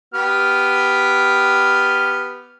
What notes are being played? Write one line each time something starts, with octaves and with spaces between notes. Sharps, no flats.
B3 G4 F6